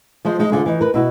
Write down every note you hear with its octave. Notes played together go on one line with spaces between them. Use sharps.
F3 G#3 C5
G#3 D#4
D2 D3 F4 G#4
E3 D#4
A#4 B4
B2 E4 F#4